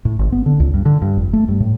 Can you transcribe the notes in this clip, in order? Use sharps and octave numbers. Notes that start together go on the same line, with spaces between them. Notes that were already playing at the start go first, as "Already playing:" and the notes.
A2
G#1
B3
D3
C#2
G2
D3
G2
F1
A3
G2
A2